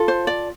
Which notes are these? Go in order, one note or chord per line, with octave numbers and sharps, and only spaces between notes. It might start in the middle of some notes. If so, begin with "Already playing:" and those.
Already playing: F4 A4
C5
D5